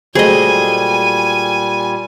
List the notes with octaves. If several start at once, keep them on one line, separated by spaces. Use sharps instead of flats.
A#2 F#3 G3 A3 G#4 C5 D#5 G#5